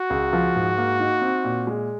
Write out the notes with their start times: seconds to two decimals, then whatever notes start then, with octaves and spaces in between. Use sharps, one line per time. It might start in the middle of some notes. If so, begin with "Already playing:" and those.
Already playing: F#4
0.10 C#2
0.33 F3
0.56 G#2
0.78 A#3
1.00 D#4
1.22 C4
1.44 A#2
1.67 G#3